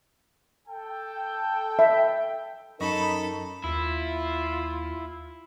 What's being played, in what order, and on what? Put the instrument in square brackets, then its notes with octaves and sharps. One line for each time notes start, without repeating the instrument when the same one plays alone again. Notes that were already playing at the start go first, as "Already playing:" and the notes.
[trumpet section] A4 G5
[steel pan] E5
[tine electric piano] F#2 D#5 C#6 [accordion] D#4 [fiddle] A4 B5 [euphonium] A#4
[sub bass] D#2 [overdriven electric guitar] E4 [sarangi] F4